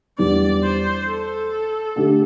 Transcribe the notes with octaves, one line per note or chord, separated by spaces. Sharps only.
E2 E3 G3 D4 G4 D5
C5
A4
D3 A3 D4 G4